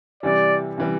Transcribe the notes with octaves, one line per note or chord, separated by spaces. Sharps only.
C3 E3 G3 D5
C3 E3 G3